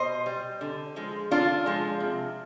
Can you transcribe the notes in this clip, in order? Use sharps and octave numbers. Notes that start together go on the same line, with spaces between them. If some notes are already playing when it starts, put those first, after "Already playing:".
Already playing: B2 C5 D#5
G3
D3
F3 G#3
D3 D4 F4
F3 G#3
C3